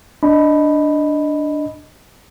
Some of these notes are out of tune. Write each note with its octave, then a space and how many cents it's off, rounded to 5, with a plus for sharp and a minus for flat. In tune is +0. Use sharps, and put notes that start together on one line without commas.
D4 +0 D#5 +0 B5 +0